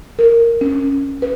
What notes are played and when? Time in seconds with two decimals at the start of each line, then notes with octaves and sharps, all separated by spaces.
0.19 A#4
0.61 C#4
1.22 B4